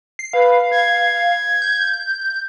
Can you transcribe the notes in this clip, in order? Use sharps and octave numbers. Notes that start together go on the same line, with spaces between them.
C7
B4 F5
G#6
G6